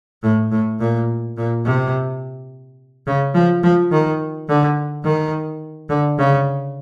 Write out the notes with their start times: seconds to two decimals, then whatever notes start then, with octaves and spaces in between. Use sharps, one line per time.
0.23 A2
0.51 A2
0.80 A#2
1.37 A#2
1.65 C3
3.07 C#3
3.35 F3
3.63 F3
3.91 D#3
4.49 D3
5.04 D#3
5.89 D3
6.18 C#3